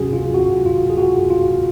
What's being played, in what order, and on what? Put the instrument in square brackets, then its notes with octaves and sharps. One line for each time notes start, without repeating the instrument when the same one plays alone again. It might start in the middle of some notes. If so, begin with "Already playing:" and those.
Already playing: [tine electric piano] C3 F#3 C#4 F#4 G#4
F4
F#4
F4
G#4
F#4
F4